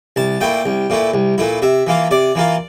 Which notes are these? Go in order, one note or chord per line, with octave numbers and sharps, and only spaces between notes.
C2 A5
A#2 A3 E4 G5
C2
A#2 A3 E4
C2
A#2 A3 E4
C3 E5
E3 A#3 F4
C3 D5
E3 A#3 F4